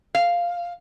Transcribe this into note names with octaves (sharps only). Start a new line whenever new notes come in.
F5